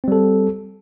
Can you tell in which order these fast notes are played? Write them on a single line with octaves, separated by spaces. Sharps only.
C4 G3 A4